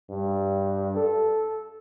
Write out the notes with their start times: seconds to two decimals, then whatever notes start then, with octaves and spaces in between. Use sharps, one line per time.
0.10 G2
0.96 A4